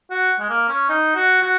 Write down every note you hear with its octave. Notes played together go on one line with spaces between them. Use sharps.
F#4
G#3
A#3
C#4
D#4
F#4
F#4